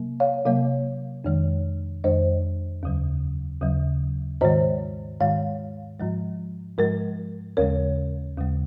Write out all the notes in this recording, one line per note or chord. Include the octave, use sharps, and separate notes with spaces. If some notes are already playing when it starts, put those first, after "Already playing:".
Already playing: C3 F#3 A#3
C#5 F5
C3 F#3 A#3 C#5 F5
F2 D#3 G#3
F2 D#3 G#3 C5 D#5
D#2 C#3 F#3
D#2 C#3 F#3
G#2 D#3 G#3 C5 D#5
G#2 D#3 G#3 C#5 F5
G#2 F3 G#3
G#2 F3 G#3 A#4
D#2 C#3 G#3 A#4 C#5
D#2 C#3 G#3